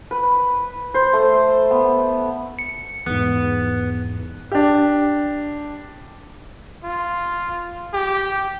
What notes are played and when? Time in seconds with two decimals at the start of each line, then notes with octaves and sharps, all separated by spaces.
0.11 B4
0.94 C5
1.13 A3
1.71 B3
2.59 C#7
3.06 E2 G#2 B3
4.52 D4 G4
6.84 F4
7.93 G4